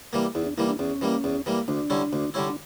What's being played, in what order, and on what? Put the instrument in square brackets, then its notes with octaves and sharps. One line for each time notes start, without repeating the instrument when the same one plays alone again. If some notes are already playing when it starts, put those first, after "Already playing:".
[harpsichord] E3 G3 A#3
[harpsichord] E2 [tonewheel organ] E4
[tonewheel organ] D4
[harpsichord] E3 G3 A#3 [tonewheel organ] E4
[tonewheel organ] D4
[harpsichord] E2 [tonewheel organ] C#4
[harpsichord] E3 G3 A#3
E2
E3 G3 A#3
[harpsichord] D2 [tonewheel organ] D4
[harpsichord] D3 G3 C#4 E4
D2
D3 G3 C#4 E4
[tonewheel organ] D4